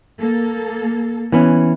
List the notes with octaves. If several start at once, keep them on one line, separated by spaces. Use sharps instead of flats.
A#3 A4
E3 B3 C#4